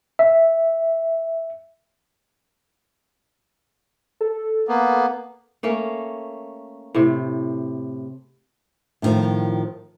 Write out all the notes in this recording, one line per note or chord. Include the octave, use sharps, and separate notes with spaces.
E5
A4
A#3 B3
A3 A#3 C#4
A2 C3
A2 D3 D#3 F3